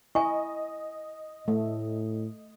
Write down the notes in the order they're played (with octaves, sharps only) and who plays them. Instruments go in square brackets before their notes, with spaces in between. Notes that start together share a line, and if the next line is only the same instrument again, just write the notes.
[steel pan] E4 [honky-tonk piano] D#5 [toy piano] G#5 C#6
[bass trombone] A2 [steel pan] A3